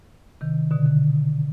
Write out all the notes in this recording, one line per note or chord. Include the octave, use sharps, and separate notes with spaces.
C3 D#3
B2 D3
B2 D3